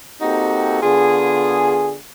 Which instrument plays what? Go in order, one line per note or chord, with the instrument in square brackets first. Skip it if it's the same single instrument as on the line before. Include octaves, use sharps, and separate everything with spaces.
[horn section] A#3 C4 D#4 F#4 G4 A4
D3 B3 F4 G#4